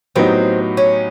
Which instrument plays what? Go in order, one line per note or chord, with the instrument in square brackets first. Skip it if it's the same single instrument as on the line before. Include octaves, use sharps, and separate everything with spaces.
[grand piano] A2 F#3 B3 D#4 G4 [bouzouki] C4
[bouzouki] C#4